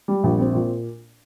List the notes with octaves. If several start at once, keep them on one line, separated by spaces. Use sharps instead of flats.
G3
A#1
C4
A#2